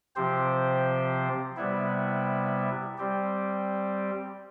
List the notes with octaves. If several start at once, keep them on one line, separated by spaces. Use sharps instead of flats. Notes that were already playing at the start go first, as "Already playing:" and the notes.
C3 F3 C4 G4 C5
C3 G3 B3 E4
G3 C4 G4